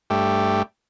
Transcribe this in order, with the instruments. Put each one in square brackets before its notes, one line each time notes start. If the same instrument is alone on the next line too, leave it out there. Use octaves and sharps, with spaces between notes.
[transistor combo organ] G2 A3 G4